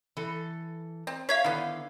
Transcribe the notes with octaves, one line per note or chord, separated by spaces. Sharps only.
E3 A4
C4
C#5 E5 F5 G#6 B6
D3 D#3 B3 E4